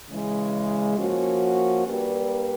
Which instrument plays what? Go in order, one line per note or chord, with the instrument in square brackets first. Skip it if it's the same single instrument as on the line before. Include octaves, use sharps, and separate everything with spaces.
[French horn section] C#3 E3 G#3
F3 A#3 C#4 F#4
G3 A#3 D4 G4 B4